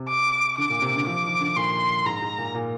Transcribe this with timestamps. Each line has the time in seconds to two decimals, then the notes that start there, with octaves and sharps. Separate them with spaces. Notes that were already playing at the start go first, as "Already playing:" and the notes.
Already playing: C3
0.09 D6
0.58 D3 D6
0.70 A#2
0.82 C3
0.95 D3
1.06 F3 D6
1.24 D#3
1.40 D3
1.56 A#2 C6
2.06 G#2 A#5
2.22 G#2
2.38 A#2
2.55 A#2